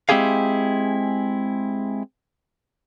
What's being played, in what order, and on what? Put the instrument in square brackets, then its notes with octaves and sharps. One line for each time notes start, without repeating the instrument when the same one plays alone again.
[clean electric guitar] G#3 C4 E4 G4 G#4 F5